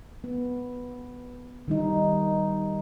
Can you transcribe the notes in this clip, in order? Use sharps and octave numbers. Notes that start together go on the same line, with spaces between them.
B3
D#3 G3 D#4